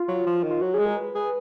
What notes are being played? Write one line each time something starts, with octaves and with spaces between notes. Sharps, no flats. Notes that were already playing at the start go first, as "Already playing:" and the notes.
Already playing: F4
F#3
F3
D#3
F4
F#3 F#4
G#4
G#3
A#4
B4
G#4